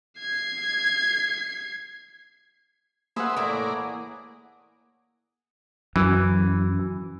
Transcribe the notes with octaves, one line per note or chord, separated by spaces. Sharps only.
G#6 C7
A#3 G#4 B4 C5 E5 F#5
A2 E3 E4 A#4 D5
F#2 E3